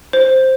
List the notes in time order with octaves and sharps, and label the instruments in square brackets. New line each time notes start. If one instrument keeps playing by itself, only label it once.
[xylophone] C5